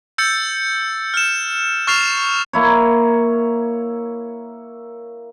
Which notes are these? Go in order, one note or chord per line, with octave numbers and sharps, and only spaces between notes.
E6 G6 A6 C#7
F6 E7
C#6 F6 A6 C7 E7 F7
A#3 E4 C#5